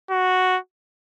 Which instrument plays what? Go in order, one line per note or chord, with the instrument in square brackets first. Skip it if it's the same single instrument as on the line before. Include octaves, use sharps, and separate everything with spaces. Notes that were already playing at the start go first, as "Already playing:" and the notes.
[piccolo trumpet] F#4